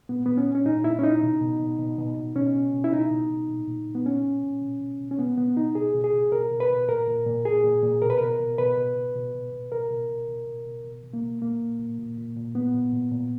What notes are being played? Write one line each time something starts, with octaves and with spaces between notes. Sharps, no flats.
A#2 B3
A#2 B3
C#4
A#2
C#4
A#2 D#4
A#2 E4
C#4
A#2 D#4
B2
B2
B2
B2
B2
B2
B2 C#4
B2
B2
E4
B2 D#4
B2
B2
A#2
A#2
A#2
B3
A#2 C#4
A#2
A#2
B2
B2
B2
C#4
B2 B3
B2 B3
B2 D#4
B2 G#4
B2
G#4
B2
B2 A#4
B2
B4
B2
A#2 A#4
A#2
A#2
A#2 G#4
A#2
A#2
B2 A#4
B4
B2 A#4
B2
B2 B4
B2
B2
B2
B2
B2
B2 A#4
B2
B2
B2
B2
B2
B2
B2
A#3
B2
A#2 A#3
A#2
A#2
A#2
A#2
A#2
A#2 B3
A#2
A#2
A#2